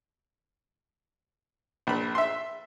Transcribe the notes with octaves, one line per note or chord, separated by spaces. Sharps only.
A#1 B5
E5 C6